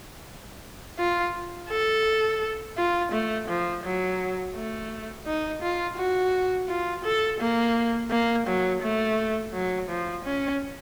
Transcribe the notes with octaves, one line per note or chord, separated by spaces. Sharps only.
F4
A4
F4
A3
F3
F#3
A3
D#4
F4
F#4
F4
A4
A#3
A#3
F#3
A3
F#3
F3
C#4